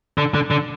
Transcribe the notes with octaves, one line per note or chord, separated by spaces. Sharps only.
D3
D3
D3